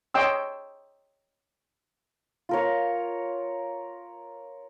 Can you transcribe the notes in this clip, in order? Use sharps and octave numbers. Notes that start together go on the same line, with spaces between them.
C#5 D#5 G5 C6 E6
F4 A#4 C#5